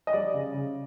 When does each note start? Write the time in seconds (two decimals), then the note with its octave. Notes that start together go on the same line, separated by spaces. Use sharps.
0.07 D#5
0.13 G3 D5
0.34 C#3
0.54 C#3